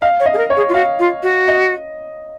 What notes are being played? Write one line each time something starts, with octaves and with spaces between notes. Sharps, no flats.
D#5 F5
C#5
D#5
G#4
A#4
C#5
G#4
F4
F#4 F5
F4
F#4
D#5